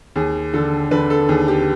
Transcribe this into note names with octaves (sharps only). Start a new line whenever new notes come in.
D#2 G#4
D3 A4
D3 B4
A4
D#2 G#4
G4